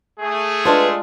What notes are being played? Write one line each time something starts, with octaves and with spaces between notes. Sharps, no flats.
A3 G#4
G#3 D4 F4 B4